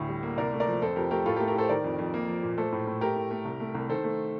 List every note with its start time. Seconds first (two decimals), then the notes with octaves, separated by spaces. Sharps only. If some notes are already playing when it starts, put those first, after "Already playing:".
Already playing: D2 A2
0.09 G3
0.23 A#3
0.38 C2 A#4 D5
0.53 A3
0.60 A#4 D5
0.67 F3
0.82 F2 A4 C5
0.96 F2 G4 A#4
1.11 A3 G4 A#4
1.26 A2 F4 A4
1.36 G4 A#4
1.40 A3
1.48 G4 A#4
1.55 A2 A4 C5
1.69 D#3 A#4 D5
1.84 F2
1.99 F2
2.14 A#3
2.28 F3
2.43 A#2
2.58 A3 A4 C5
2.72 A2
2.87 A2
3.01 A3 G4 A#4
3.16 A2
3.31 A3
3.45 C2
3.60 A3
3.75 C2
3.89 D#3 A4 C5
4.04 A3